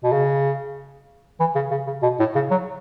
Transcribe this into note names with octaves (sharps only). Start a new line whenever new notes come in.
B2
C#3
E3
C#3
C#3
C#3
B2
A2
C#3
F#3